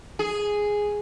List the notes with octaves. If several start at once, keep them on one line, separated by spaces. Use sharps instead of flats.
G#4